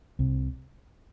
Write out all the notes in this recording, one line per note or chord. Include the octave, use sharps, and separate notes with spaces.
C2 C3